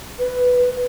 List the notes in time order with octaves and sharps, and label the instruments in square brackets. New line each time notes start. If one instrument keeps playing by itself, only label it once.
[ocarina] B4